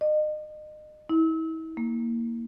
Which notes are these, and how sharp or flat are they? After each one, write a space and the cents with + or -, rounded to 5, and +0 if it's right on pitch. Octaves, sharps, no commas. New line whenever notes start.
D#5 -35
E4 -40
A#3 -5